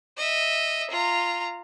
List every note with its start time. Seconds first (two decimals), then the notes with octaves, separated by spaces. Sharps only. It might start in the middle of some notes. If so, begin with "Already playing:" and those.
0.17 D#5 E5
0.90 F4 A#5